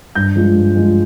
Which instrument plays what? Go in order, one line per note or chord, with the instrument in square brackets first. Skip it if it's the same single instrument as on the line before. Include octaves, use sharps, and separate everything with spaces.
[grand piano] G2 G6
F3 G#3
G2
F3 G#3